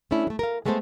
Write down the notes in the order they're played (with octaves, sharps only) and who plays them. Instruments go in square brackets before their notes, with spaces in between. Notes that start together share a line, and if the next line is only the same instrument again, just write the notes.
[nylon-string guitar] A3 C#4 D4 E4
F#3 A3
A#4 F5
G#3 A3 B3 A4 B4 C5